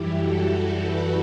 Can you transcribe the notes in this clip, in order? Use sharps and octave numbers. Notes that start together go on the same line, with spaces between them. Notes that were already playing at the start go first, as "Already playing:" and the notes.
Already playing: F#2 E3 G3 E4 G4
F#4 A4
F#4 A4
G4 B4